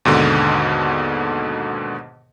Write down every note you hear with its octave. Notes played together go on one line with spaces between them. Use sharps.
D#2 G#2 B2 D3